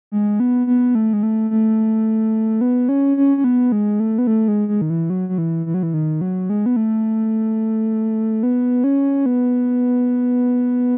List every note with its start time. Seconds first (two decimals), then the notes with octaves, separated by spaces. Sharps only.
0.12 G#3
0.40 B3
0.67 B3
0.95 A3
1.13 G#3
1.23 A3
1.51 A3
2.61 B3
2.89 C#4
3.17 C#4
3.37 C#4
3.44 B3
3.72 G#3
4.00 A3
4.18 B3
4.27 A3
4.48 G#3
4.68 G#3
4.81 D#3
4.90 E3
5.10 F#3
5.29 F#3
5.38 E3
5.66 E3
5.74 F#3
5.83 E3
5.94 D#3
6.21 F#3
6.50 G#3
6.66 B3
6.76 A3
8.43 B3
8.84 C#4
9.26 B3